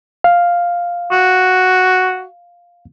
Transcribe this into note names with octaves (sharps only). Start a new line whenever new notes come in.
F5
F#4